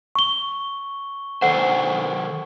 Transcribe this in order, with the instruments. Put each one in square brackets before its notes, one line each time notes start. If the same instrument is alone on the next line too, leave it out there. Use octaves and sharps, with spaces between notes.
[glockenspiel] C#6 G7
[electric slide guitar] D#3 A4 C5 [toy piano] F#5